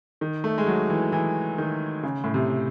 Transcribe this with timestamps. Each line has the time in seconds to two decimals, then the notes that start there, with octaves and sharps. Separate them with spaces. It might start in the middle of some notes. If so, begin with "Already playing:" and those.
0.21 D#3
0.44 A3
0.58 G#3
0.67 F#3
0.90 E3
1.12 E3
1.58 D#3
2.03 C#3
2.24 A2
2.34 C3